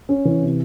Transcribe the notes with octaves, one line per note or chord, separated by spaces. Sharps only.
C#4
E3
C3